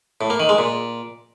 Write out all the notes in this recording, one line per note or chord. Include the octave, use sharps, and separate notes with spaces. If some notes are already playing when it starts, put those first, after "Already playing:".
A2
A#3
D#3
G#3
A#2